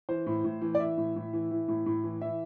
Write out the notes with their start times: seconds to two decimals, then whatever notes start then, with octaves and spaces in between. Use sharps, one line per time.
0.09 E3 C5
0.27 A2
0.44 A2
0.62 E3
0.75 D5
0.80 E3 E5
0.97 A2
1.16 A2
1.33 E3
1.51 E3
1.68 A2
1.86 A2
2.04 E3
2.21 E3 E5